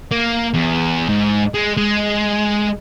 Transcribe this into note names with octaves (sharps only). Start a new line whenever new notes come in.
A#3
E2
G#2
G#3
G#3